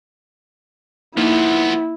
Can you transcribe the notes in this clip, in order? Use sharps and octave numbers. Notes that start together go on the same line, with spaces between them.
F3 A#3 B3 D#4 E4